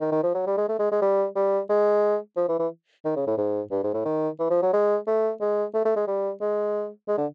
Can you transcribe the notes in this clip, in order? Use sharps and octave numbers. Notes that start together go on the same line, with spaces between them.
D#3
D#3
F3
F#3
G3
G#3
A3
G#3
G#3
G3
G3
G#3
F3
E3
E3
D#3
C#3
A2
G#2
G2
G#2
A2
D#3
E3
F3
F#3
G#3
A3
G#3
A3
A3
G#3
G3
G#3
G#3
D3